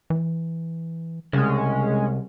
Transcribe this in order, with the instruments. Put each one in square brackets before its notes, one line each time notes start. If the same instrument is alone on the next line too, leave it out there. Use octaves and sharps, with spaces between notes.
[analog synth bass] E3
[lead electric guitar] C2 [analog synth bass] C#3 [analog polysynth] G#3 C#4